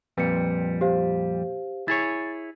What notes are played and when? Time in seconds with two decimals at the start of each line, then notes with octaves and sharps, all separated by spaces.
0.17 F2 A#2 G3 B4 C#7
0.81 G4 C5 F5
1.88 E4 G#4 C#5 A6